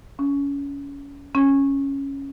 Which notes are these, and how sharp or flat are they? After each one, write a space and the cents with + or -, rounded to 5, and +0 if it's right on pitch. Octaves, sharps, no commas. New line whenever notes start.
C#4 +25
C#4 -5